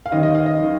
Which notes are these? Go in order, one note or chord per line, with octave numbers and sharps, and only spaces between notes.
F5
D#2 D#3 D#5
D#5
F5
D#5
D#3